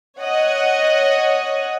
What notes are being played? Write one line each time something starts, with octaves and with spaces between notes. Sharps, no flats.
C#5 D#5 F#5